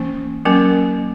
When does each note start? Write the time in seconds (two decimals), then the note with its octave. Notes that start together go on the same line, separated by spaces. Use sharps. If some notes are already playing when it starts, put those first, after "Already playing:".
Already playing: E3 A#3 C#4
0.45 F#3 A#3 C#4 A#4